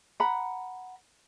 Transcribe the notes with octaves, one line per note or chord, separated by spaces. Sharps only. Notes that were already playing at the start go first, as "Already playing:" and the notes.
F#5 A#5 B5